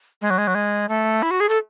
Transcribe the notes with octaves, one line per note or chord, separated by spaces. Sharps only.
G#3
F#3
G#3
F#3
G#3
A3
E4
F#4
G#4
A4